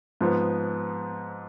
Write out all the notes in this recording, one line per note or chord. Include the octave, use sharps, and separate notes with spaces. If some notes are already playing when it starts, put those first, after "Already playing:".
G#2 F3 B3